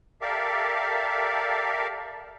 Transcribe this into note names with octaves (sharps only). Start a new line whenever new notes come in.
G4 A4 A#4 D5 E5 F5